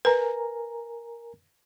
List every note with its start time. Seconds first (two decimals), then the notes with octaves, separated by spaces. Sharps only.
0.05 A#4 B4 G#5 A#5